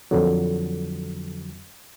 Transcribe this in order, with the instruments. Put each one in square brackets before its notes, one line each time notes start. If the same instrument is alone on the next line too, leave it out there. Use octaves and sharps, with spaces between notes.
[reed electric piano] F2 D3 F#3